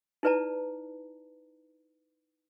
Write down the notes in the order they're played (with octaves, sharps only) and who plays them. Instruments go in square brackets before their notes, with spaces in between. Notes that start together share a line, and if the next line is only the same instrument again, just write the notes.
[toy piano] D#4 E4 B4 D5 A5 A#5